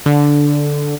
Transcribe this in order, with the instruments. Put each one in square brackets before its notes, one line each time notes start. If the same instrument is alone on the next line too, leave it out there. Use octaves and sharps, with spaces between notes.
[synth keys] D3